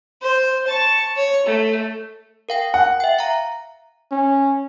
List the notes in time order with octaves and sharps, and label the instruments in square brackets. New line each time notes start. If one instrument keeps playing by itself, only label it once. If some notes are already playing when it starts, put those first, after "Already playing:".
[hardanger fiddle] C5
A5 C#6
C#5
A3
[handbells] A#4 F5 G5
[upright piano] F#5
[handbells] E5 G5
F5 A#5
[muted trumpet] C#4